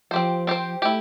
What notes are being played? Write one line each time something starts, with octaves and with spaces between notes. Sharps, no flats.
F3 C4 G4 C5
C4 G4 C5
A3 E4 G4